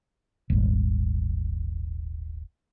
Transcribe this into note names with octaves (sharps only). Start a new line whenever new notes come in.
D#1 G#1